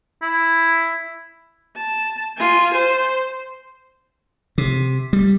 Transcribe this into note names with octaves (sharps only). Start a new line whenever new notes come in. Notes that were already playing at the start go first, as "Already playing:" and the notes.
E4
A5
F4 G#5
C5
C3
G3